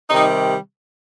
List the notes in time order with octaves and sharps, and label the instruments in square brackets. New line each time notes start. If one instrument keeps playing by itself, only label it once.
[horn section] C3 D#3 G3 D#4